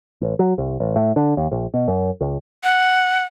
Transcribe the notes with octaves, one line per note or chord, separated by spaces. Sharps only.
A1
F#3
C2
A1
A2
D3
D#2
A#1
B2
F#2
C#2
F#5